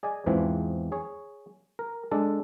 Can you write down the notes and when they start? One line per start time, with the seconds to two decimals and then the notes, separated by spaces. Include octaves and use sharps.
0.03 G#4 D5 D#5 G#5
0.26 E2 G#2 E3 F3 C4
0.92 G#4 C#5
1.79 A#4
2.11 G#3 D4 A4